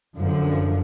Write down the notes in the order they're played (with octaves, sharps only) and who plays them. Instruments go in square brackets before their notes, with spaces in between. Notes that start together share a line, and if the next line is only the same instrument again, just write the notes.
[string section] F#2 D3 F3